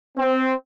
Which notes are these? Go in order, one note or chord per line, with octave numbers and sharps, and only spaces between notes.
C4